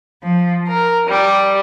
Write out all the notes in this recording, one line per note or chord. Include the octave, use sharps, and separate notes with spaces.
F3
A#4
G3